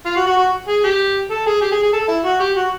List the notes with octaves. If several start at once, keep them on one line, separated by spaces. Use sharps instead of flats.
F4
F#4
F#4
F#4
G#4
G4
A4
G#4
G4
G#4
G#4
A4
E4
F#4
G4
F#4